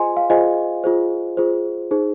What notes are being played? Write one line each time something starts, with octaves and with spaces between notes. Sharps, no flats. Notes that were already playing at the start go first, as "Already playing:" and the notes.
Already playing: F4 G#4 C5 D#5 G#5 C6
F5
F4 G#4 C5 D#5 G#5
F4 G#4 C5
F4 G#4 C5
D#4 G#4 C5